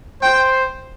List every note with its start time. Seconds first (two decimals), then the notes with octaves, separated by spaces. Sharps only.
0.23 C5 G5